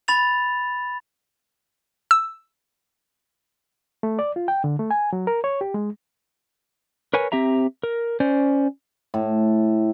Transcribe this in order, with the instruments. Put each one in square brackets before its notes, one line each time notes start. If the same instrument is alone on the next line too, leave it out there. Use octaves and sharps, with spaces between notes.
[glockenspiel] B5 A6 F7
[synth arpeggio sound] E6
[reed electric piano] A3
D5
F4
G5
D3
A3
G#5
F#3
A#4
C#5
G4
G#3
[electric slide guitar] A#4 B4 C#5 G#5
C4 G4 E5 A#5
A#4
C#4 C5 D5
[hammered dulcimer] A2